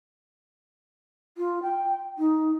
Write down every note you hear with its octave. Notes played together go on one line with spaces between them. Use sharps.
F4
G5
D#4